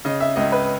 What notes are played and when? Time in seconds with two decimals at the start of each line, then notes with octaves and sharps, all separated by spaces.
0.05 C#3 D#5
0.20 E5
0.36 C#2 D#5
0.52 B4